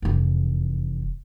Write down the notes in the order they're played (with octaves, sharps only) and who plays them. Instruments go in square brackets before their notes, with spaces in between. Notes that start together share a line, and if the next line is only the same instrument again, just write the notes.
[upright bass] F1 E2